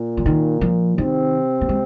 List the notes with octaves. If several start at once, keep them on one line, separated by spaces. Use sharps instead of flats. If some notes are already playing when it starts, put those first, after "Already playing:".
Already playing: A#2 A#3
F3
D#3
F3
C3 D#3 C4
A#3
G#3